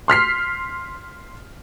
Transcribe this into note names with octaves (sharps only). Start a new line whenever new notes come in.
C6 F6 B6 C7